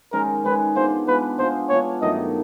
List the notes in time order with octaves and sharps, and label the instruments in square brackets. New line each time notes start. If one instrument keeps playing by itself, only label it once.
[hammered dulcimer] D#3 G#3 C#4 [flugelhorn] A#4
[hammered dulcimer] D#3 G#3 C#4 [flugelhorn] B4
[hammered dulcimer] G#3 B3 D4 F4 [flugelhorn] C5
[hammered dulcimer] G#3 B3 D4 F4 [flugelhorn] B4
[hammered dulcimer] G#3 B3 D4 F4 [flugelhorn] C5
[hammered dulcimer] G#3 B3 D4 F4 [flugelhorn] C#5
[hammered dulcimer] G2 D#3 F#3 A3 [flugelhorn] D#5